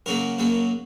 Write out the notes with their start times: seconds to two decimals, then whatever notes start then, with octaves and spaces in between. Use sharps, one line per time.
0.06 F#2 C#3 F#3 A#3 A#4
0.38 F#2 C#3 F#3 A#3